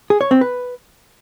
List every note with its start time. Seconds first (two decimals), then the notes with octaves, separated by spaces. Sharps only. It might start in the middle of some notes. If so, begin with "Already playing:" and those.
0.10 G#4
0.21 C#5
0.31 C4
0.41 B4